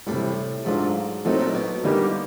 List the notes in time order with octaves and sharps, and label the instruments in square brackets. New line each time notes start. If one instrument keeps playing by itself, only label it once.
[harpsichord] A2 [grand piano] C3 E3 G3
[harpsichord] G#2 [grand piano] F#3 A3 D4 F4
[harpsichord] A2 [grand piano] F#3 A3 C4 D#4
[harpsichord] A#2
B2
[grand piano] D3 G3 A#3 D#4 G4